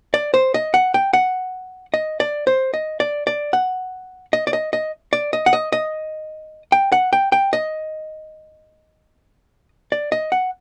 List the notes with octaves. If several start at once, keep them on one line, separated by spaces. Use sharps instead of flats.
D5
C5
D#5
F#5
G5
F#5
D#5
D5
C5
D#5
D5
D5
F#5
D#5
D5
D#5
D#5
D5
D#5
F#5
D#5
D#5
G5
F#5
G5
G5
D#5
D5
D#5
F#5